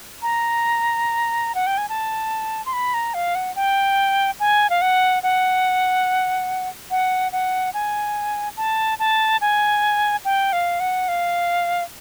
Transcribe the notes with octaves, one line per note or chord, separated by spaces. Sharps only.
A#5
F#5
G5
G#5
A5
C6
B5
A#5
F5
F#5
G5
G#5
F5
F#5
F#5
F#5
F#5
G#5
A5
A5
G#5
G5
F5
F#5
F5